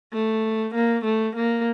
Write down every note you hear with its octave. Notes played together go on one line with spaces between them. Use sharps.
A3
A#3
A3
A#3